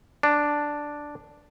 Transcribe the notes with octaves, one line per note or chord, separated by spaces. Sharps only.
D4